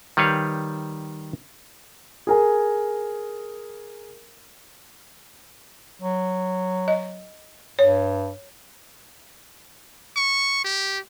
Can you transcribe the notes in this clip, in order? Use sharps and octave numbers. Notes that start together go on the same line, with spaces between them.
D#3 G3 B4 C#5 F5
G#4 A#4 G#5
F#3
D#5
G2 C#5
C#6
G4